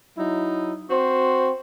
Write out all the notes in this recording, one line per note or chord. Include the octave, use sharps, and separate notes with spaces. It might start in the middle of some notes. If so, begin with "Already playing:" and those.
F#3 D#4 E4
C4 F#4 C5